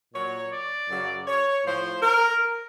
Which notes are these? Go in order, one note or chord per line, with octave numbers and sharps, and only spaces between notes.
A#2 F#3 C#5
D5
F#2 C#3 F#3
C#5
A2 F3 C5
A#4